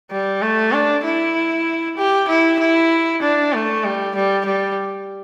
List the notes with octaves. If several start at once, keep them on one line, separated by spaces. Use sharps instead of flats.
G3
A3
D4
E4
G4
E4
E4
D4
A3
G3
G3
G3